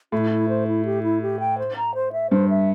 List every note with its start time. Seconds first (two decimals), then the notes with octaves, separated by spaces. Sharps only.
0.12 A2 E4
0.31 E4
0.49 C5
0.67 E4
0.85 G4
1.03 E4
1.22 G4
1.40 G5
1.58 C5
1.76 A#5
1.95 C5
2.12 E5
2.30 G2 C5
2.49 E5